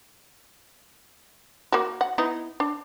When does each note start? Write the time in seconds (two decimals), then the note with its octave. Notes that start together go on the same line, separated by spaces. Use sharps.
1.72 A#3 F#4
2.01 F#5
2.18 B3 D#4 E4
2.60 D4